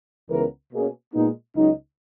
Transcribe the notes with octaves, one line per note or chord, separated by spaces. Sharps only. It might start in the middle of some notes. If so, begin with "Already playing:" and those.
C#2 C#3 E3 B3 A#4
B2 A#3 C#4 G#4
A#2 G#3 B3 D#4
C#2 C#3 F#3 D#4